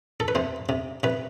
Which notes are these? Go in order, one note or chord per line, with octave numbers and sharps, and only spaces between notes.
A4
B4
C3 C5
C3
C3 B4